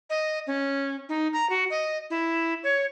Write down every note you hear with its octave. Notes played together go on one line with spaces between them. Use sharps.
D#5
C#4
D#4
A#5
F#4
D#5
E4
C#5